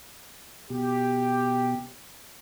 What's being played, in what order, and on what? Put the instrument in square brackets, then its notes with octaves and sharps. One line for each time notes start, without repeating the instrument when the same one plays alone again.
[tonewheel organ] B2 [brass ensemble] G4